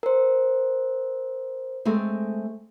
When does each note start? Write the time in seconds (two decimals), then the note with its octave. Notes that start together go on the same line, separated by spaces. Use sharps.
0.03 A#4 C5
1.85 G#3 A3 C4